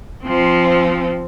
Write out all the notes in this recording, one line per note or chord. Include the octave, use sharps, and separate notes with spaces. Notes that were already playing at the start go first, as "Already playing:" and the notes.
F3 C4